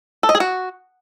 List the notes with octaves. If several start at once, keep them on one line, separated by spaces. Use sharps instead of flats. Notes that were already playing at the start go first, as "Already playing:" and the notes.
A4
D#5
G#4
F#4